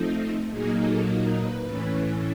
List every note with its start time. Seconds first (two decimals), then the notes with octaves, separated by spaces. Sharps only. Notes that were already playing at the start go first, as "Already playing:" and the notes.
Already playing: F3 A3 C4 D#4
0.50 A#2 F#3 A#3 D#4 G#4
0.79 A4
1.07 A#4
1.35 B4
1.63 A2 E3 A3 C#4